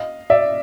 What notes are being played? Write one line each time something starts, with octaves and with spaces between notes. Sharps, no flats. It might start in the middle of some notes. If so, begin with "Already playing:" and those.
Already playing: D#5 F5
D5 E5